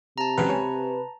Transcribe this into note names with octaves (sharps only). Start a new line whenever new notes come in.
C3 A5 A#5
C#2 C#3 F#3 B4
C#5 G#5